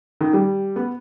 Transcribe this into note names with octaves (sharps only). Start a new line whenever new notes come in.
D#3
G3
B3